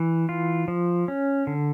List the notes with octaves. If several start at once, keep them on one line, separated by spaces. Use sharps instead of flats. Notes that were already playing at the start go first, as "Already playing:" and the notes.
Already playing: E3
F4
F3
C#4
D3